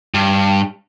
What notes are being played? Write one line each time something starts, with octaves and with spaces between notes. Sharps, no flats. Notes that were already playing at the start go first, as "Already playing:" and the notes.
G2